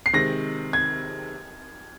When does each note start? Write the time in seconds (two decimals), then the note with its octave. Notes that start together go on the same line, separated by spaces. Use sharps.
0.06 C7
0.13 C3 D#3 G#3 A#6
0.73 G#6